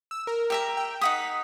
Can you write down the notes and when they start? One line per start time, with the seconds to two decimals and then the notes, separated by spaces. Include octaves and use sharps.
0.11 E6
0.27 A#4
0.50 G4 E5 A#5
0.77 G5
1.01 D#4 F#5 D#6 B6